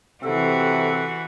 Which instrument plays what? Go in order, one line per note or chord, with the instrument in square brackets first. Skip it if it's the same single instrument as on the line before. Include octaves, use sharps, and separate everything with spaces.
[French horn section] C3 [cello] E3 F#4 [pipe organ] A4